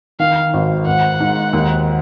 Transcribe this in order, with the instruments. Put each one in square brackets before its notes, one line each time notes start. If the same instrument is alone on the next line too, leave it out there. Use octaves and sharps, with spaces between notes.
[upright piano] D#3 [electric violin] F5
[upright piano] G#1
[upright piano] G#1 [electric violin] F#5
[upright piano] G#2
D#2